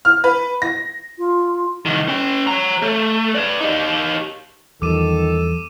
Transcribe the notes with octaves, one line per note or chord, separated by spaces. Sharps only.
F6
B4
A#6
F4
C2 D#3
C#4 G5
C#5 A#5
A3
B4 D5
D#4 G4
E2 D#3 F3 G3 A4 D6 D#7 E7